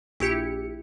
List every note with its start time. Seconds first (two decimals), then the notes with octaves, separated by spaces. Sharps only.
0.20 A#1 E4 G4 C#7